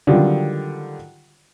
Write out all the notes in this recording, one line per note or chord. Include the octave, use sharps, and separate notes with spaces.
D3 D#3 F#3 G3 F4